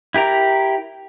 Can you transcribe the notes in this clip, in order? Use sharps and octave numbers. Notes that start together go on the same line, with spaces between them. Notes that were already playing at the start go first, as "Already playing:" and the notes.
E4 G4 A#4 A#5